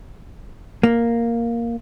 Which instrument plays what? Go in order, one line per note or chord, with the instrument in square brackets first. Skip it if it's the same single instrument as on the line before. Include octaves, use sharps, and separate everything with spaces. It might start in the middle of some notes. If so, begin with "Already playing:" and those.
[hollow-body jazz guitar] A#3